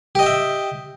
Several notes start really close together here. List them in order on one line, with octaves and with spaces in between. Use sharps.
G4 D#5 G5 E5